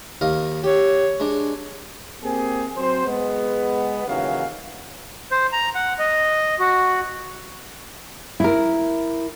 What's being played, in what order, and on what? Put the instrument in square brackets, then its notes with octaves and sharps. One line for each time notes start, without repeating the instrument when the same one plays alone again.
[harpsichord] D#2 D#5 F5
[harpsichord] G4 [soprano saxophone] C#5
[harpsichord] G#3 D4
[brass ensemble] A#3 C4 G4 G#4
F#3 C4 C5
G#3 B3
D#2 C#3 E3 F#3 F5
[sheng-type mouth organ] C5
A#5
F#5
D#5
F#4
[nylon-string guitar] E4 A#4